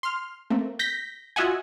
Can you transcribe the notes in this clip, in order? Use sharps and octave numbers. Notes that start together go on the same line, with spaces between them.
C6 F6
A3 A#3 C4
G6 A#6 B6
F4 F#4 D#5 E5 F#5 G#5